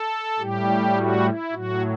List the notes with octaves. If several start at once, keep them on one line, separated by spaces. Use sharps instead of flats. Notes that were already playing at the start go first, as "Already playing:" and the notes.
Already playing: A4
A2 G3 G4
F#4
E4
A2 F#3 F#4